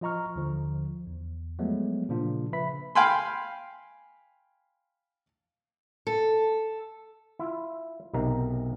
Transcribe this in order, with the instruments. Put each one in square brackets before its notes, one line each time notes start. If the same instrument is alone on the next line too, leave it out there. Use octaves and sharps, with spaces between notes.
[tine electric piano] F3 F4 D#5 A#5 C#6 F6
D#2 D3 F3
E2
F3 F#3 G#3 A3 B3
A#2 C#3 F3 A#3 D4 F4
C#3 B4 E5 B5 B6
[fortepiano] F5 G5 G#5 B5 C6
[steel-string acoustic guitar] A4
[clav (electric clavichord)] E4 F4
B1 C3 D#4 A#4 F5